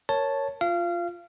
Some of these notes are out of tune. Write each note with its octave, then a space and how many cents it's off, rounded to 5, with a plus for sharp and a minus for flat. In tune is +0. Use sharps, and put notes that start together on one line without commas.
A#4 +0 C#5 +0 A5 +0
F4 +0 F5 -25